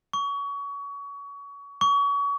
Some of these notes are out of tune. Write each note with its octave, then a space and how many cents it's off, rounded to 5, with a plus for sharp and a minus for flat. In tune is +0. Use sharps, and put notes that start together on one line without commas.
C#6 +30
C#6 +35